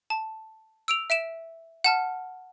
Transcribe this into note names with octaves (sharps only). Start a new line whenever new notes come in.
A5
E6 D7 F7
E5 D7 E7
F#5 A5 F6